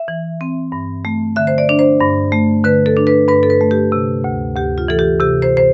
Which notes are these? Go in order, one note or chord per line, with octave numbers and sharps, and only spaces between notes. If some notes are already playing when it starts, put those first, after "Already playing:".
Already playing: E5
E3
C4
G2
A3
D3 E5
C5
D5
D4
C5
G2
A3
D3 B4
A4
D4
B4
G2 B4
A4
B4
A3
G4
C3
D2
D2 G4
F4
E3 A4
G4
C3 G4
C5
C5